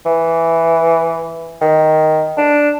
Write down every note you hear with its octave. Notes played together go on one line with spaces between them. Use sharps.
E3
D#3
D4